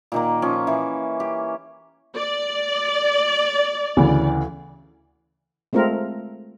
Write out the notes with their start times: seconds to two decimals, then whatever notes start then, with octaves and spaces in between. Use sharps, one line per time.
0.12 A#2 D#3 A#3
0.42 F3 C#4
0.67 E3
1.20 G4
2.16 D5
3.97 D2 C#3 E3
5.73 G#3 A3 C4 F4 A#4